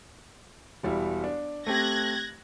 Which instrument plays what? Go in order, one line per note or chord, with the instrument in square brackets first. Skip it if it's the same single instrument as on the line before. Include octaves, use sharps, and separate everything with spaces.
[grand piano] E1 G3 E4
D4
[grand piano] A3 C4 G4 [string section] F#6 G#6 A#6